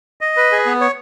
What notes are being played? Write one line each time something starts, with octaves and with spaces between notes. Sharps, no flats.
D#5
B4
G#4
B3
C#5